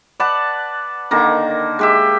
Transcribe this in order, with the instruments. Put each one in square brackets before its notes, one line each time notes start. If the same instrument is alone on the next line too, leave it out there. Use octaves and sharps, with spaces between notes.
[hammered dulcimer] B4 D5 F#5 A5
D3 D#3 A#3 A#5
G#3 G4 E5